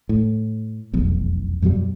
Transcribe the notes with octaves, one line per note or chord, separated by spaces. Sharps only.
A2
F1 B1 E2
F#2 B2 F#3 G3